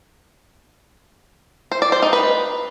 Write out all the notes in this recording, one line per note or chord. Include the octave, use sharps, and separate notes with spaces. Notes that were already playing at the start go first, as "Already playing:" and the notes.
C5
D5
C5
D#4
B4